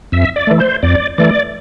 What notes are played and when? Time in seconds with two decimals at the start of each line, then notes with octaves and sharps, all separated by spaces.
0.12 F2 E5
0.36 D5
0.47 E3 A3
0.60 C5
0.83 F2 D5
1.18 E3 A3 D5